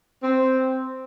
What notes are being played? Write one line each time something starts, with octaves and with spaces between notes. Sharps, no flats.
C4